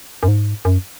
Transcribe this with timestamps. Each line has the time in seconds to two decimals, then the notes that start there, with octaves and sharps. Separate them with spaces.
0.23 F#2
0.28 G#2
0.65 F#2